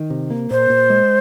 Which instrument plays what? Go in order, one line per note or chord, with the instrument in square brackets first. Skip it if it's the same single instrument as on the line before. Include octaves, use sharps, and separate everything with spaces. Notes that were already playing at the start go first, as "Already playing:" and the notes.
Already playing: [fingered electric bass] D#3
C3
A#3
[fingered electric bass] A#2 [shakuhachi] C5
[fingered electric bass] A#2
G#3